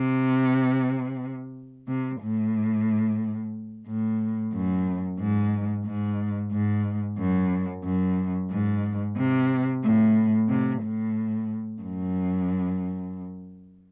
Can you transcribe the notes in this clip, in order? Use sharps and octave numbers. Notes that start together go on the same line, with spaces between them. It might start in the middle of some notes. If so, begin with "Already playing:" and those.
Already playing: C3
C3
A2
A2
F#2
G#2
G#2
G#2
F#2
F#2
G#2
C3
A2
C3
A2
F#2